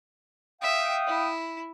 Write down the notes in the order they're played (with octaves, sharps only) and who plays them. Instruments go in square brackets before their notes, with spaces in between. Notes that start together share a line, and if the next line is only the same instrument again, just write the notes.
[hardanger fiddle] E5 [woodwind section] F5 G5 D#6
[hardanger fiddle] E4